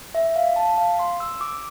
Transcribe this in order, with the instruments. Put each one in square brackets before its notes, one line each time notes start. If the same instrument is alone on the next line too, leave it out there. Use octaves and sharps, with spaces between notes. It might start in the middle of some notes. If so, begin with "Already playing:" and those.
[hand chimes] E5
F5
A5
F5
C6
E6
D6